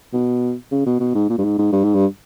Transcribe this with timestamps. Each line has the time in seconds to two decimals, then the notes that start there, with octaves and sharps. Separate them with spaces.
0.13 B2
0.72 C#3
0.86 B2
1.00 B2
1.15 G#2
1.29 A#2
1.38 G2
1.44 G#2
1.59 G#2
1.73 G2
1.84 G#2
1.95 G2